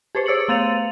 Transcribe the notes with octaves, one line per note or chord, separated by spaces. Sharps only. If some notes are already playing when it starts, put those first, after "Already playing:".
G4 G#4 B4 C5
C5 C#5 E6 A6 C#7 F#7
A3 B3 F5 A6 D#7 F7